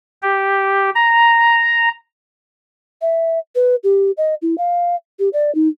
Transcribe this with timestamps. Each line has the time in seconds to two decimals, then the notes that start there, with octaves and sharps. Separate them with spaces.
0.22 G4
0.95 A#5
3.02 E5
3.55 B4
3.84 G4
4.17 D#5
4.42 E4
4.58 F5
5.19 G4
5.33 D5
5.55 D#4